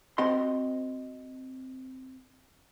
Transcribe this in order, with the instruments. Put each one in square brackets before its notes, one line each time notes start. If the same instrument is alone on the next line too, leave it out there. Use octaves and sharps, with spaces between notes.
[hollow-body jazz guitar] C4 F#4 D#5 C6